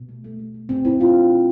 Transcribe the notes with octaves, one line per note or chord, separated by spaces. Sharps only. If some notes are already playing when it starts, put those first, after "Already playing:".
Already playing: B2
A3
A3
A3
A3
B2 C4
B2 C4 E4
B2 D4 F4
B2
B2